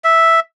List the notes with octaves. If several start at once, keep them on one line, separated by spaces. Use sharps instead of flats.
E5